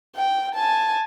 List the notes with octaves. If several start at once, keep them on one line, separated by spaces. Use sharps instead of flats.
G5
G#5 A5